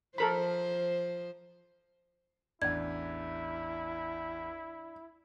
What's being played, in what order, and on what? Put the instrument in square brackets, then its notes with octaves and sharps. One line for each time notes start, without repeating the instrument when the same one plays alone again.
[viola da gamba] F3 C5 [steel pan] A4 A#4 B5
[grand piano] A1 E2 [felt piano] D4 [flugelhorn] E4 [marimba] G#6